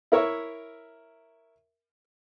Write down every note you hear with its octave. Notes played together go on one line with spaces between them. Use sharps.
E4 A#4 C#5 E5